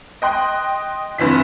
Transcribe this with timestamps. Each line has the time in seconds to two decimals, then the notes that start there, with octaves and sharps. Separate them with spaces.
0.22 D#5 G5 C6 F#6
1.18 F#1 G2 C3 E3 B6